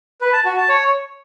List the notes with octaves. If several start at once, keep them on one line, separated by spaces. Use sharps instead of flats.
B4
A5
F#4
A5
C#5